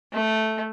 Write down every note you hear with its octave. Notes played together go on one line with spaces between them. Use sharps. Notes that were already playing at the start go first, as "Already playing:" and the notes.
A3